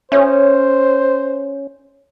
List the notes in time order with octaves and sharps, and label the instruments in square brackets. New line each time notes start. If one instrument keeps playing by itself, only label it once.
[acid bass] C#4 [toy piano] A4 C#5 E5 [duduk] C5